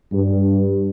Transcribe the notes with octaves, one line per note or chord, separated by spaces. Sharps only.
G2